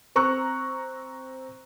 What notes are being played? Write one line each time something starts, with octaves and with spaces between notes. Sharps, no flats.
C4 A#5 C#6 E6 F#6